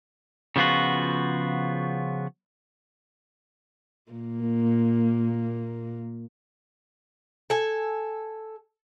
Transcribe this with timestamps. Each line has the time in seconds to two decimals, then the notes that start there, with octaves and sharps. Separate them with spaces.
0.56 C#3 F3 B3 F4 F#4
4.12 A#2 A#3
7.50 A4 G#5